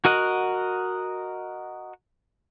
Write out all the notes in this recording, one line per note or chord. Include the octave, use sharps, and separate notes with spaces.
F#4 A#4 D#5 F#5